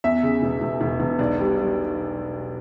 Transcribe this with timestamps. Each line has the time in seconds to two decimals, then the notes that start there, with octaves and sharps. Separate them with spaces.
0.04 E2 E5
0.23 C#3
0.42 E1
0.61 E1
0.81 E1
1.00 E1
1.19 B1 D5
1.38 G3
1.57 G3